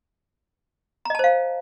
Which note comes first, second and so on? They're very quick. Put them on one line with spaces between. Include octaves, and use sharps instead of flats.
A#5 D#5 A5 C5 F5